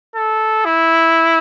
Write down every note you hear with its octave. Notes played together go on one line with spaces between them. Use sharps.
A4
E4